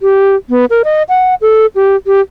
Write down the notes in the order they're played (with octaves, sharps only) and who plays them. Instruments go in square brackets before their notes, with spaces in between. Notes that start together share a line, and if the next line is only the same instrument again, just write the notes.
[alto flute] G4
B3
A#4
D#5
F#5
A4
G4
G4